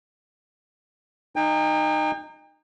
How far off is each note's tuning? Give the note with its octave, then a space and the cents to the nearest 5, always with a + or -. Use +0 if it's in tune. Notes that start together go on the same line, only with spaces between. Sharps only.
D#4 -20 G5 +35